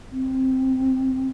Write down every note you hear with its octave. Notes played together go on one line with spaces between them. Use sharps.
C4